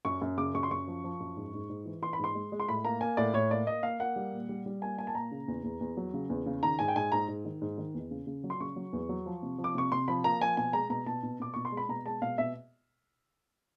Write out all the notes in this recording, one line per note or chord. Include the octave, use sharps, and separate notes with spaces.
F#2 C#6
F#2
C#3 D6
F#2 C#6
C6
F#2 C#6
F3
F3
F#2
G#2
G#2
G#2
E3
E3 C6
B5
G#2 C6
G#3
G#3
C6
A2 B5
A#3 A#5
A#3 G#5
A2 D5
A2 C#5
A#3 D5
A#3 D#5
A#3 F5
A#3 F#5
G3
A#2
G3
G3
A#3 G#5
A#3 G#5
A5
A#2 A#5
C#3
E2
E2
E2
F#3
C#3
E2
C#3
D#3 A#5
G#2 G#5
G5
G#2 G#5
G#2 A#5
G#2
D#3
G#2
D#3
E2
C#3
C#3
F#3
C6
C#3 C#6
F#3
E2
F#3
F3
C3
F3
D6
C3 C#6
C3 C6
F3 B5
A#3 A#5
F3 G#5
B2 G#5
G#3 A#5
B2 A#5
B2 A5
B2
B2 D6
B2 C#6
C6
G#3
B5
B2 A#5
G#3 A5
B2 F5
B2 E5